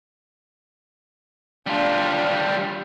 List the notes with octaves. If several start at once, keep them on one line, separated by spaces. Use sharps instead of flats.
G3 D4 F4